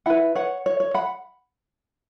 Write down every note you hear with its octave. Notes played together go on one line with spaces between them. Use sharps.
E4 B4 F#5 B5
C#5 F#5
C#5
C#5
F#5 B5